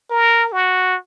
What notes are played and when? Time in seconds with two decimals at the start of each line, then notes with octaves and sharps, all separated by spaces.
0.10 A#4
0.52 F#4